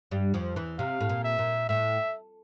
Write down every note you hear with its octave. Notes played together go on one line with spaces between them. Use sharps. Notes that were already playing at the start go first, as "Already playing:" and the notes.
G2 G3
F2 F3
E2 E3
C3 F5
A2
A#2
E5
A#2
A2 E5